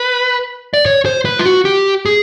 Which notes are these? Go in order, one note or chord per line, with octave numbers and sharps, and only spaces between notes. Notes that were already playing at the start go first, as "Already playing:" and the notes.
Already playing: B4
D5
C#5
C5
B4
F4
F#4
G4
G#4